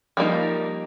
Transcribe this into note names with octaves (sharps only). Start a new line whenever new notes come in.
F3 G3 A#3 D#4